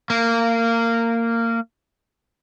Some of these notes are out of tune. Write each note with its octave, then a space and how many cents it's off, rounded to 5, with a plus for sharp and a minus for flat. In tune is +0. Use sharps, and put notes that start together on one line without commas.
A#3 -20